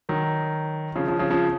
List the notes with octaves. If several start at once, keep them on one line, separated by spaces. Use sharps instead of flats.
D#3 F#3
C#3 F3
C#3 F3
C#3 F3
C#3 F3